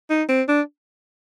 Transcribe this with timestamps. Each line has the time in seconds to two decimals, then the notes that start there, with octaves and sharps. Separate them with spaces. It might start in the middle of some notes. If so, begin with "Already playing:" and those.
0.10 D#4
0.29 C4
0.48 D4